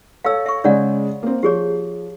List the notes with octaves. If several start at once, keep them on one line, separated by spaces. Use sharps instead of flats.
A4 C#5 F5 E6
E5 C#6
C#3 G#3 C#5 D5 F#5
A#3 C4
F3 G4 G#4 C#5